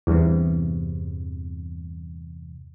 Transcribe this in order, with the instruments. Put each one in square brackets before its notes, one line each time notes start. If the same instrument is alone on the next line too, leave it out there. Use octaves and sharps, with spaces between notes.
[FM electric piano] E2 G2 C3